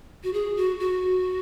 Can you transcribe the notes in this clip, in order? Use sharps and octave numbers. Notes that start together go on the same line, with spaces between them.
F#4
G#4
F#4
F#4